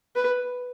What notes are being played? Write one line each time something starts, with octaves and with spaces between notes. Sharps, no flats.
B4